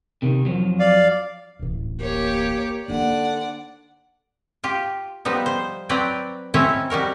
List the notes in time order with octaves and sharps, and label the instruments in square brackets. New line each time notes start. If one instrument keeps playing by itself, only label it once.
[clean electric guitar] C3 D#3
F2 F3 F#3
[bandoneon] D5 F5
[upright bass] D1 A1
[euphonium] A#3 [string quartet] G4 C#5 D6
[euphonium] D3 [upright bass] A#3 D#4 [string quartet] D5 F#5
[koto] F4 G4
F3 G3 B3 D#4
C5
F#3 C4 B4 D5 G5 A#5
C4 C#4 D#4 E4 C#5 D#5
G3 D#4 F#4 A#4